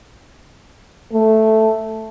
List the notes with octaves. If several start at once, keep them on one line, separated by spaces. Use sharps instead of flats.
A3